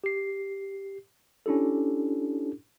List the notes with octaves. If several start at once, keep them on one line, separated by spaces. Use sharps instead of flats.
G4 C7
C#4 D4 E4 G4 A4